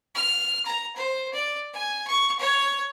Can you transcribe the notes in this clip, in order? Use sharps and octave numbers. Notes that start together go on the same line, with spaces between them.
F6
A#5
C5
D5
G#5
C#6
C#5